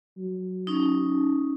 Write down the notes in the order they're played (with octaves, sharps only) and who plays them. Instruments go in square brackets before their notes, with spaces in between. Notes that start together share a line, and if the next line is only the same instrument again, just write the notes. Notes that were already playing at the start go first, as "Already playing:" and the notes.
[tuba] F#3
[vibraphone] C#4 D#4